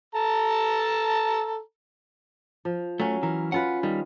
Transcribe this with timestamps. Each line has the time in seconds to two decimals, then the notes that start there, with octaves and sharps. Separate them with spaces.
0.15 A4 A5 A#5
2.65 F3
3.00 F#3 A3 C#4
3.23 E3 A#4
3.52 C#4 F4 B4 F#5
3.83 D#3 G3